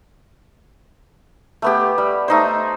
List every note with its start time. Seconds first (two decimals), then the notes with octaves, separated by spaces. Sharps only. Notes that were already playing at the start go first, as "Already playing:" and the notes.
1.62 A3 B3 G4
1.98 G3
2.28 A3 D#4 C5